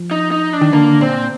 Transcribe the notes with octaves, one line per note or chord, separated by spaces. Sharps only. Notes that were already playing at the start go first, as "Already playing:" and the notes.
Already playing: F3
D#4
D#4
D4
D#3
D3 A#3
A#2 C4